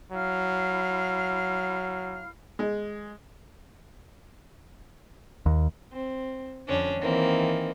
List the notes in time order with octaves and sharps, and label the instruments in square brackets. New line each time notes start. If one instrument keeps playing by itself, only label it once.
[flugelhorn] F#3 [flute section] E4 F5 F6
[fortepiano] G#3
[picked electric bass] D#2
[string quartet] C4
F2 D3 C#4 D4
D#3 E3 A#3 C4